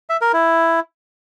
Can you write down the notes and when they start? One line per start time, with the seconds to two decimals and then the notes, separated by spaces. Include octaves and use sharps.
0.10 E5
0.21 A#4
0.33 E4